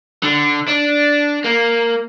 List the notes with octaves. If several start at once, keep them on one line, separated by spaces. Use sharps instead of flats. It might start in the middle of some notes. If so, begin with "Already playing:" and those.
D3
D4
A#3